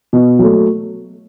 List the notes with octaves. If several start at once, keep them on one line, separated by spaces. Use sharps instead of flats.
B2
F#3 A3